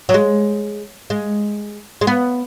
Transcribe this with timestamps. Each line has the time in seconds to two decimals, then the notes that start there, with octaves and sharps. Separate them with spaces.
0.09 F#3
0.14 G#3
1.10 G#3
2.01 G#3
2.07 B3